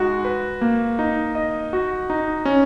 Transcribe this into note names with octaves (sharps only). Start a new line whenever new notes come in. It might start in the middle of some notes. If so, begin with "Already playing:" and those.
Already playing: G#3 D#4 F#4
B4
A#3
D#4
D#5
F#4
D#4
C#4